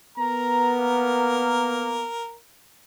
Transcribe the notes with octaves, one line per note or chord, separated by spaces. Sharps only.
B3 A#4 A#5
A#3